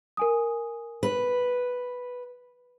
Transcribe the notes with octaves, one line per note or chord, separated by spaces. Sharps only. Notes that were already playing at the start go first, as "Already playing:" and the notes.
A#4 G#5 D#6
B4